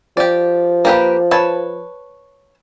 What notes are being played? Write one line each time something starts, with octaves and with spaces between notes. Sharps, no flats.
F3 G4 D5
A#3 G4 B4
B4 C#5 A5